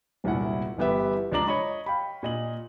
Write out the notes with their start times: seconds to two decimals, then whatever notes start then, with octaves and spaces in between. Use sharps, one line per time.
0.24 E1 C2 A#2 E4 F#5
0.78 G1 E3 B3 G4 B4 E5
1.32 C#2 F3 D4 D5 A#5 F#7
1.46 C#5 D#5 B5 C#6
1.86 F5 G5 B5
2.23 A#2 D#5 F#7